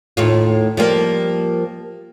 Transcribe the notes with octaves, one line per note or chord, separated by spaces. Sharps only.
D#2 A2 F4
F3 G3 A#3